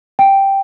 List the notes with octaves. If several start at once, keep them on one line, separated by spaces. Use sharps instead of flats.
G5